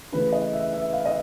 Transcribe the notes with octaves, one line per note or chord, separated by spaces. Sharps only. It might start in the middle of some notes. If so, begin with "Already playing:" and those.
C#3 E3 A3 B4
D#5
E5
E5
F5
D#5